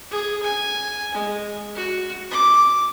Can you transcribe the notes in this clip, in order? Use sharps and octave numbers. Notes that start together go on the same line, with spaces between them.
G#4
G#5
G#3
F#4
D6